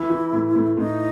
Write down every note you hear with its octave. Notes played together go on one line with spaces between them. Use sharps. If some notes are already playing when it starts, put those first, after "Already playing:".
Already playing: E3 E4
E3
A2
A2
A2 D#4